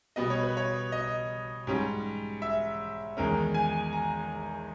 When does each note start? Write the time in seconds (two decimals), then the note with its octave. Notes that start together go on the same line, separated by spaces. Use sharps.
0.16 B2 G3 B3 D#5
0.30 C#5
0.43 B4
0.57 C#5
0.92 D#5
1.67 G#2 G3 C#4
2.42 E5
3.17 E2 D#3 G#3 C#4 A#4
3.54 G#5
3.93 A#5